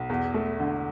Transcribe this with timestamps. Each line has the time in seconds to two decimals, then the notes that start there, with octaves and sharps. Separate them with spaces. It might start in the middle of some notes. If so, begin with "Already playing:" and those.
Already playing: B1
0.10 E2
0.34 A3
0.60 D3